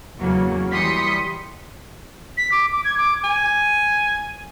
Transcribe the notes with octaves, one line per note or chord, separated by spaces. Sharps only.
E2 C#3 F#3 A#3
E3 G3 C6 D#6 B6 C#7
B6
D6
D6
G#6
D6
G#5